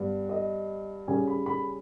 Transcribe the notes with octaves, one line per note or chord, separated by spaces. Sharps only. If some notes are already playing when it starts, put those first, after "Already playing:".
Already playing: G2 G3 B3
D#5
C#3 G3 C#4 G#5
B5
B5